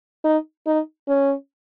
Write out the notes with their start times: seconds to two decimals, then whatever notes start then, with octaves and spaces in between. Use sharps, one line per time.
0.24 D#4
0.67 D#4
1.08 C#4